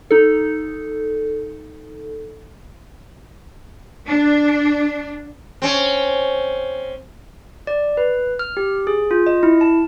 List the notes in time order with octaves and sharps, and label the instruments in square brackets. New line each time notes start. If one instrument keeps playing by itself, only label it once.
[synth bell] D#4 A4
[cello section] D4
[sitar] C4 C#4
[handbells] D5
B4
F6
G4
G#4
F4
D#5
E4
A5